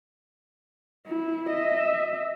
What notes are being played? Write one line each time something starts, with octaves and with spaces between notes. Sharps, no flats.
E4
D#5 E5